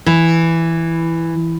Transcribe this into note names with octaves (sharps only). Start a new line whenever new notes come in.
E3